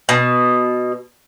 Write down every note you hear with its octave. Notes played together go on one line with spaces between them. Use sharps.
B2